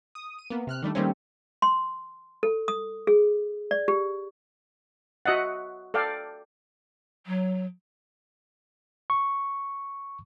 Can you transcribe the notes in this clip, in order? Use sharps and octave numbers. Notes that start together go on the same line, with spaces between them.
D#6
D#7
A#3 B3
C3 F6 F#6
D#3 G3 A3 D4
D#3 G3 A3 A#3 C4 C#4
C6
A4
D#6
G#4
D5
G4
F#4 D#5 E5 F#5
A4 D5 F5 G5
F#3
C#6